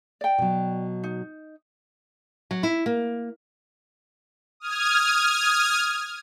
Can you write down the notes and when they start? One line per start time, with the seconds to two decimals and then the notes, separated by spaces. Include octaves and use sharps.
0.21 D5 G5
0.38 B2 F#3
1.03 D#4
2.51 F#3
2.63 E4
2.86 A#3
4.60 D#6 F6 G#6